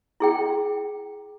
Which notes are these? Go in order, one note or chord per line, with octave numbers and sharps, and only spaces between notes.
E4 G#4 G5